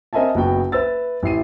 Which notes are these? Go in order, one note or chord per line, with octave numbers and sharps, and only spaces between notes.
C4 A#4 D#5 E5 G#5 A5
F#1 B3 F#4 G5
B4 E5 E6 A6
A1 E4 C7 D#7